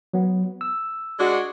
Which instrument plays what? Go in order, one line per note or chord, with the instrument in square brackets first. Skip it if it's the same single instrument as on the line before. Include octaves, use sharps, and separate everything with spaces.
[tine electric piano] F#3 B3
E6
[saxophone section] G#3 D4 F#4